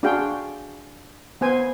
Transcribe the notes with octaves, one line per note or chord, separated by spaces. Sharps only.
D4 F#4 G#4 F5 G5
B3 C5 G#5